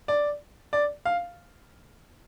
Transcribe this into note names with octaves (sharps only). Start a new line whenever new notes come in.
D5
D5
F5